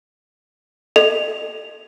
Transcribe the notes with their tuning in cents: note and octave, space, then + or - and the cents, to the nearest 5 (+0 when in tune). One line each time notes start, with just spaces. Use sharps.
A4 +0 D#5 -35